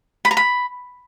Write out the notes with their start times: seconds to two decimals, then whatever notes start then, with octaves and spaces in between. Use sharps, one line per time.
0.25 B5
0.31 A#5
0.37 B5